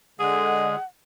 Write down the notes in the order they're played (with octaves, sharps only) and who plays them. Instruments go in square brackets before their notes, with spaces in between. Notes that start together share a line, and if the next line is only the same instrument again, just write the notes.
[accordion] D3 G#3 [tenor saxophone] G#4 [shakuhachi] F#5